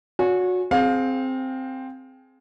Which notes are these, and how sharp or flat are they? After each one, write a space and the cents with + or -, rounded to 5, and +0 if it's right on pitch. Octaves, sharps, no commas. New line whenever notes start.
F#4 -25 C#5 +35 G#5 +0
C4 +0 G#4 +20 F5 +25